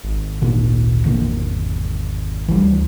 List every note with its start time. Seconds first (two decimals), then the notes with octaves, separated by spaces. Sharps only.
0.04 G#1
0.42 D2 A#2 D3
1.04 E1 D3 A#3
2.48 D2 E3 G3